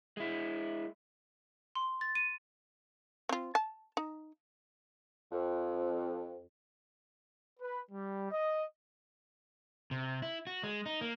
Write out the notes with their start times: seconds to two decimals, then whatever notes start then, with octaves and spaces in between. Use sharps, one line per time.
0.17 G#3 E4
1.75 C6
2.01 A6
2.15 D#7
3.29 C4 F4
3.55 A5
3.97 D#4
5.32 F2
7.60 B4
7.91 G3
8.31 D#5
9.91 C3
10.22 E4
10.47 F#4
10.63 G#3
10.86 D#4
11.01 A#3